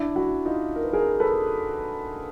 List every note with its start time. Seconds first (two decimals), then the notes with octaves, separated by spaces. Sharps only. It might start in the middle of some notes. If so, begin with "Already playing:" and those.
Already playing: D4 E4
0.16 E4 F#4
0.45 D#4 F4
0.76 A#4
0.84 B4
0.93 G#4 A#4
1.20 A4 B4